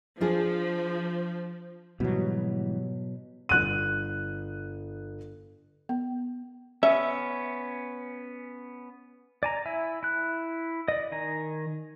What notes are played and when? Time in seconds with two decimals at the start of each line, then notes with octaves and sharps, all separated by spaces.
0.21 F3 D4 F4 G#4
2.00 G#2 B2 E3 F#3 G3
3.49 G1 F#6 D#7
5.89 B3
6.83 B3 C#4 E5
9.43 D5 G#5 A#5
9.65 E4 E5 G#5
10.03 E4 F#6
10.88 D5 D#5
11.12 D#3 G#5 A#5